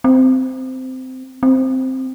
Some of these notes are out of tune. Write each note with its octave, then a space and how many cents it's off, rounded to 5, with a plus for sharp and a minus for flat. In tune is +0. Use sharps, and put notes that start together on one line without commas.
C4 -15
C4 +0